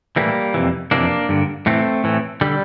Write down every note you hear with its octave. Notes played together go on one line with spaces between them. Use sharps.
A2 E3 G3 A#3
F2 C3 E3
F2 C3 E3 A#3 D4
G2 D3
A2 E3 A3 C4
A2 E3
D3 G3